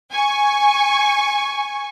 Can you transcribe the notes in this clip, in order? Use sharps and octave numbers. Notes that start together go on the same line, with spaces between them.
G#5 C#6